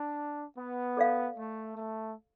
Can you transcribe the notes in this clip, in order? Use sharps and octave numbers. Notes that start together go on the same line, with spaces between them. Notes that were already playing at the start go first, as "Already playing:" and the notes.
Already playing: D4
B3
A4 D5 F5
A3
A3